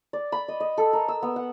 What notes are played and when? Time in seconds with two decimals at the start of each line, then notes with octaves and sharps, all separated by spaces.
0.13 D5
0.32 B5
0.48 D#5
0.60 D#5
0.78 A4
0.93 A#4
1.08 E6
1.22 B3
1.36 F#5